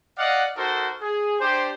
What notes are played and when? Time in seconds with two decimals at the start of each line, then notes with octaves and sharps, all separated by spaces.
0.18 D5 D#5 F5 F#5
0.57 D#4 F#4 A4 A#4 C5
1.02 G#4
1.40 D4 G4 C5